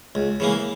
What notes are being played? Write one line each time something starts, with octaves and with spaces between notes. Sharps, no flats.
C#2
C#3 E3 A#3